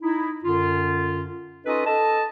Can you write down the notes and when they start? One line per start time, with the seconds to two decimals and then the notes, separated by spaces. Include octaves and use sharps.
0.02 D#4 E4
0.44 F#2 D3 C#4 F4
1.66 C#4 D#4 F4 A4 B4 D#5
1.86 A4 D#5 A5